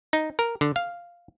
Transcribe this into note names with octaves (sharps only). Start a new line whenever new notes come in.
D#4
A#4
D3
F5